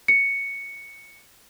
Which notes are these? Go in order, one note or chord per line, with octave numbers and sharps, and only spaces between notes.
C#7